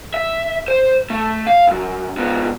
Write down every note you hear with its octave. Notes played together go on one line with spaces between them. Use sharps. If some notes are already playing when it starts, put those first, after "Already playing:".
E5
C5
A3
F5
C2 F#2
G#2 B3